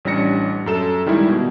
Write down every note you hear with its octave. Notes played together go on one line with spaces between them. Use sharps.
A1 G3 C#4 D4 A#6 C#7
F#2 A4 E7
D#3 G3 G#3 E4
B2